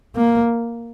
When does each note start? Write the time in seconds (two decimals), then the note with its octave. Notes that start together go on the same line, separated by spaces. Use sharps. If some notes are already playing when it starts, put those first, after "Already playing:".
0.16 A#3